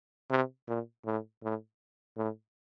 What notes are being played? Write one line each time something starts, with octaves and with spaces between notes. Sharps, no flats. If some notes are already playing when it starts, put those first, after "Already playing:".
C3
A#2
A2
A2
A2